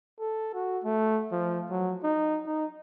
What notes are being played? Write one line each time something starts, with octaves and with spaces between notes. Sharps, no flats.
A4
F#4
A3
F3
F#3
D#4
D#4